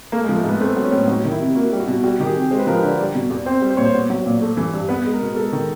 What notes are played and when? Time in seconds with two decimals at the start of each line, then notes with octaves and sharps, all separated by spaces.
0.12 A3 A#3
0.24 G#3
0.29 F3
0.37 A3
0.44 G#2 B3
0.61 A3 C4
0.76 F#3
0.84 C#4
0.92 A2
1.08 F#3 D#4
1.25 D#3
1.32 E4
1.39 C3
1.55 A#3 F#4
1.72 G3
1.80 F#4
1.87 B2
2.03 G3 F#4
2.20 D#3 G4
2.27 G#4
2.35 C3
2.51 G#3 C5
2.59 B4
2.67 F3 A#4
2.74 B4
2.83 D3
2.98 G3 D5
3.14 B2
3.30 E2
3.46 C4 C5
3.62 G3
3.70 C5
3.77 A#2 C#5
3.85 C5
3.94 B3
4.10 F#3
4.26 A#2
4.42 A3
4.57 E3
4.73 G2
4.89 B3 B4
5.05 G#3
5.13 A#4
5.21 B2
5.36 G#3 A4
5.53 D#3